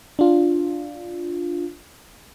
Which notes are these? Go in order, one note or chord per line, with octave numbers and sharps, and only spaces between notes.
D4 F4